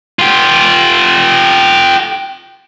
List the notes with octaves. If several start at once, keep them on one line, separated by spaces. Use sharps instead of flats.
F4 G4